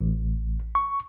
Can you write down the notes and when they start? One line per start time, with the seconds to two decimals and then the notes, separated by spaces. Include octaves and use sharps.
0.01 A1
0.75 C#6